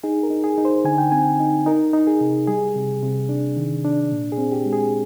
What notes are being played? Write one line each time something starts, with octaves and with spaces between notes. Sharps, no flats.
D#4 G#4
A#4
D#4
G#4
D#4
C5
D3 G#5
G5
C4 G#5
D#4
D#4 A#4
D#4
G#4
C3
G3 G#4
C3
C3
D4
D#3
D4
A#2
G#4
C4
G4
G#3
G#4